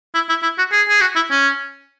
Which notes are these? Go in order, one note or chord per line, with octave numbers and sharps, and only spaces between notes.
E4
E4
E4
F#4
G#4
G#4
F#4
E4
C#4